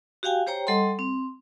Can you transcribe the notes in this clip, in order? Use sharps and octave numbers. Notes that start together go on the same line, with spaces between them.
F#4 G4 F5 G5 G#5
G4 C5 C#5 G5 A#5
G3 A4 D#5 F#5 G#5 C6
C4